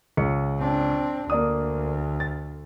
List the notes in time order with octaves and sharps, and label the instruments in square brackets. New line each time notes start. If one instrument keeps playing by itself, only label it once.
[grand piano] C#2 C#7
[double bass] C4 D4
[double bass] D2 [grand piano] A#3 D5 D#6
[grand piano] A6